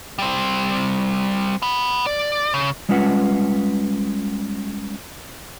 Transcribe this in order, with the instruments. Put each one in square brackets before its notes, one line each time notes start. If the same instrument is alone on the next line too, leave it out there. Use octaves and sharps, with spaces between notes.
[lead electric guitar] G3 C4
F#5 B5
D5
C#3
[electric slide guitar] G3 G#3 C#4 F4 B4 F#5